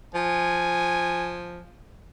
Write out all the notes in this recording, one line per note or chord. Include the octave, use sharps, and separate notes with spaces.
F3 G#5